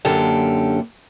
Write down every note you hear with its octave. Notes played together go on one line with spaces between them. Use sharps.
F#2 D3 A#3 G4 A5